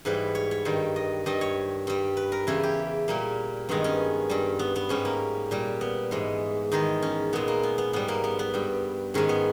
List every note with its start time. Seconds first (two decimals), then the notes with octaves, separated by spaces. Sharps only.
0.05 G#2 E3 G3 B4
0.35 C#5
0.51 C#5
0.65 G2 D#3 G3
0.96 D#5
1.26 G2 G3 D#5
1.41 C#5
1.87 G2 G3
2.17 B4
2.32 A#4
2.47 E2 C#3 E3 E4
2.63 G4
3.08 A#2 G3 A#3
3.69 G2 D#3 G#3 B3
3.84 C#4
4.29 G2 G3
4.59 B3
4.76 B3
4.89 G#2 G3 C#4
5.05 A#3
5.51 A#2 G3
5.81 B3
6.11 G#2 E3 G#3
6.72 E2 D#3 G#3 D#4
7.02 C#4
7.33 A#2 G#3 B3
7.48 A#3
7.63 B3
7.78 B3
7.93 G#2 G3 B3
8.08 A#3
8.24 B3
8.39 B3
8.54 G2 G3
9.14 G#2 D#3 G#3 C#4
9.29 B3